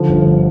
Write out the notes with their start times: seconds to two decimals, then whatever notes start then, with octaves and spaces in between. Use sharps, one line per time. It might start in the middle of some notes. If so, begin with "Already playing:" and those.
Already playing: D3 F3
0.09 G1